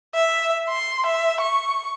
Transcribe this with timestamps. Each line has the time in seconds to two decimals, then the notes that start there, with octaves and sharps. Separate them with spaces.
0.14 E5
0.69 C6
1.06 E5
1.40 C#6